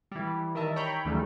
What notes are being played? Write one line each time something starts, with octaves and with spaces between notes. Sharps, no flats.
E3 G3
D#3 A#4 D#5 E5 A5
C#5 G5 A#5 B5 G6
D#2 C#3 E3 F#3 G3 A3